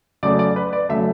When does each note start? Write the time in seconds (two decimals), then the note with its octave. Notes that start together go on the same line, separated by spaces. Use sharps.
0.23 C#3 F#3 A3 D5
0.39 D5
0.56 B4
0.73 D5
0.89 C#3 F#3 A3 E5